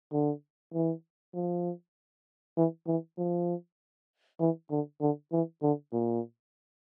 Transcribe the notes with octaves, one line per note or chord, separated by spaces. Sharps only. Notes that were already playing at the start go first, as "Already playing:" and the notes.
D3
E3
F3
E3
E3
F3
E3
D3
D3
E3
D3
A#2